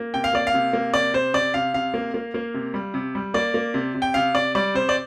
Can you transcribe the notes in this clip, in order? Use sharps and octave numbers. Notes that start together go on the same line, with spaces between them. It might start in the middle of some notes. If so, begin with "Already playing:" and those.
Already playing: A#3
C3 G5
F5
A#3 D5
F5
C3
A#3
C3 D5
C3 C5
C3 D5
C3 F5
C3 F5
A#3
A#3
A#3
C3
G3
C3
G3
A#3 D5
A#3
C3
C3
G5
C3 F5
C3 D5
G3 D5
C3 C5
D5